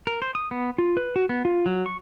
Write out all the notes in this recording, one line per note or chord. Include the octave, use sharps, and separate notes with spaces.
A#4
C5
D#6
B3
F4
B4
F#4
B3
F4
F#3
C#6